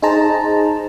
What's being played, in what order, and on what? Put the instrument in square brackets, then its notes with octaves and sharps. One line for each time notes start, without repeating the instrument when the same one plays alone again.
[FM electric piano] D#4 G#4 C5 A5 A#5